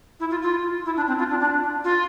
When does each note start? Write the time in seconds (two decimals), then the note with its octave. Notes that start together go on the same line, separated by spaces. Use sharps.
0.20 E4
0.31 F4
0.42 F4
0.86 E4
0.96 D4
1.07 C4
1.19 F4
1.30 D4
1.40 D4
1.84 F4